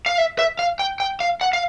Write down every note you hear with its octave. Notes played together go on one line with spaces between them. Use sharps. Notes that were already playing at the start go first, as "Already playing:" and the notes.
F5
E5
E5
F5
G5
G5
F5
F#5
F5